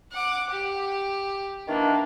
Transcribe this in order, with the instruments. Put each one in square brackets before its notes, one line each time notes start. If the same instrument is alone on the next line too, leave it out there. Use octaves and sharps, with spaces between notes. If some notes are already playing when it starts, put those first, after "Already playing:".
[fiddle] F#5 D6
G4
[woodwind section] D#3 E3 D4 [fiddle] A#3